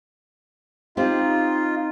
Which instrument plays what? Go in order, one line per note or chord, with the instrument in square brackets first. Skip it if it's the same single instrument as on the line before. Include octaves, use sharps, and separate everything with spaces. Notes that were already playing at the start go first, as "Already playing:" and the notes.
[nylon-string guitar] C4 G4 [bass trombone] D#4 [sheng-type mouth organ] F4